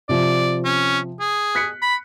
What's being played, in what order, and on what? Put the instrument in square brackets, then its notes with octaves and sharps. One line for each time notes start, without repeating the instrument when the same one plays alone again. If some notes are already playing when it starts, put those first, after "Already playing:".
[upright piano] C3 F3 [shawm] D5
[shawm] C#4
G#4
[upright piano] F#6 B6 C#7
[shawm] B5